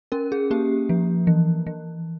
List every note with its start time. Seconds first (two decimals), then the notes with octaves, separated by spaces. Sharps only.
0.12 C#4 A#4
0.32 G#4
0.51 A#3 G4
0.89 F3
1.27 E3
1.67 E3